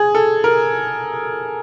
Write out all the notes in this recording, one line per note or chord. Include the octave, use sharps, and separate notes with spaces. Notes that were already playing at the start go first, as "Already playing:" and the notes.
Already playing: G#4
A4
A#4